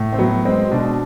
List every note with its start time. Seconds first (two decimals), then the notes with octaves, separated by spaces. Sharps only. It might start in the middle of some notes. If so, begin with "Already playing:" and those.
Already playing: A2
0.13 C4
0.19 F#3 B3
0.45 G#3 C4
0.71 B2 D4